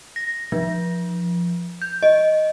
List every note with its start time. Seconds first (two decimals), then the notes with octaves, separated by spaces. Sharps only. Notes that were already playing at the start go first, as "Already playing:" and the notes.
0.16 A#6
0.52 F3
1.82 G6
2.03 D#5